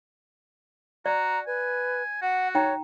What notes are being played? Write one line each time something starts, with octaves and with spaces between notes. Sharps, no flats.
F#4 D5 A#5
B4 G#5
F#4 F#5
D#4 C#5 G5 A#5